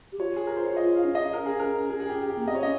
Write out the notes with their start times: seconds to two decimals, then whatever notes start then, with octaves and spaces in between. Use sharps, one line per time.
0.12 G4
0.20 F4 C#5
0.36 G#4
0.47 A#4
0.57 C5
0.66 C#5
0.77 F4 D#5
0.96 F5
1.04 C#4
1.15 D#5
1.33 A#4
1.46 G#4
1.59 A#4
1.90 G#4
2.00 G#4
2.09 G4
2.29 G4
2.37 A#3
2.48 C4 D#5
2.55 C#5
2.62 C#4 D#5